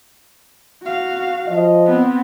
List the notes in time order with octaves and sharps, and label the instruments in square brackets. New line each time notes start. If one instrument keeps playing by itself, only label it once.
[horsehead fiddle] F#4 F5
[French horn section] F3 D#5
[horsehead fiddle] B3 C4